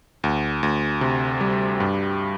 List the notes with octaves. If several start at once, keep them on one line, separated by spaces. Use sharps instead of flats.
D2
D2
C3
G3
G2